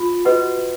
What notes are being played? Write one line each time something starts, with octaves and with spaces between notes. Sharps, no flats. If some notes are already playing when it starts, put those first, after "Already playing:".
Already playing: F4 B5
F#4 B4 D#5 F#5